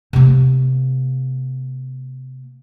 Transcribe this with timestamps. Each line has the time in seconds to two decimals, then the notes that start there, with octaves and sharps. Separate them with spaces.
0.13 C3 A#3